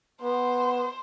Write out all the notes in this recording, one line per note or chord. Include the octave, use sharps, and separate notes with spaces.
B3 C5